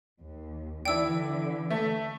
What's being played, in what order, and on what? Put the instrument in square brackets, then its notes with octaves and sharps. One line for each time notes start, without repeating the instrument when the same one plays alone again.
[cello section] D#2
[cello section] D3 E3 [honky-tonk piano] D4 E4 [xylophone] G5 E6
[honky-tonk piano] A3 E5